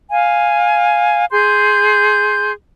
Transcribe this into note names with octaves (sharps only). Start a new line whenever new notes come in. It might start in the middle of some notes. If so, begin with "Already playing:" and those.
F5 G#5
G#4 C6 G6